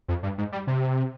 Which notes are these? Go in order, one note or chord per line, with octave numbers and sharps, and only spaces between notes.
F2
G2
G#2
G3
C3